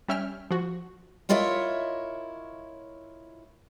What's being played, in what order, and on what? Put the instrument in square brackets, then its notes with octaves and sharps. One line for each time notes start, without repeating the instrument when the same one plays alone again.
[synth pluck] G3 C#4 E5 G5 F6
F3 F#4
[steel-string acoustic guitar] E4 F4 A#4 C#5 D#5 E5